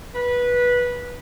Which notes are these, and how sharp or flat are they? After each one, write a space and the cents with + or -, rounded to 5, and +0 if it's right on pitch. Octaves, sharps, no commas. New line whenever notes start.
B4 -15